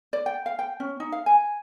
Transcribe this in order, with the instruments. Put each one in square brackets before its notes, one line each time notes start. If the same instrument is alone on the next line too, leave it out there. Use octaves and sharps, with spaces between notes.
[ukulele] D5
G5
F5
G5
C#4
D#4
F5
G#5